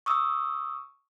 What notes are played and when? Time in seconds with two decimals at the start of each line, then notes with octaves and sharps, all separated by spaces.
0.06 C#6 D#6 E6